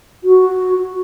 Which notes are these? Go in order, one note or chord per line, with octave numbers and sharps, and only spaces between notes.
F#4